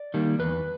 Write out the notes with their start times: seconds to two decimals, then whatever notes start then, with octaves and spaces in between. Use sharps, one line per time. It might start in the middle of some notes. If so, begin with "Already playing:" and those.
Already playing: D5
0.14 D#3 G3 A#3
0.39 E2 B4